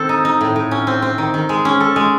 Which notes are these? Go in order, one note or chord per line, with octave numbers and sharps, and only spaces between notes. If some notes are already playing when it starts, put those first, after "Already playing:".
Already playing: D#3 C4 A4
D#4
D#4
A2
A2
C#4
C4
C4
D#3
D#3
G#3
C#4
A4
G#3